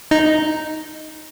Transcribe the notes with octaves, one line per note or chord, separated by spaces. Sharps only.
D#4